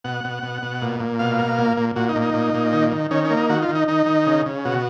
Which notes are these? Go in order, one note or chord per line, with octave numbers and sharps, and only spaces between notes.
B2 F#5
B2
B2
B2
A#2
A#2
B2 F5
A#3
A#2
A#2
A#2 F#4
D#4
A#2
D#4
A#2
A#2
D#3
D#3
D#3 C#4
C#4
A#3
D#4
D#3 F#4
F4
D#3
D#4
D#3 D#4
D#3
C#3
C#3
B2 F#4